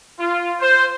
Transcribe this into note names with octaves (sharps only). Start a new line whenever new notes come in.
F4
C5